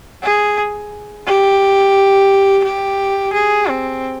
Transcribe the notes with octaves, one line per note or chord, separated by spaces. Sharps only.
G#4
G4
G4
G#4
C4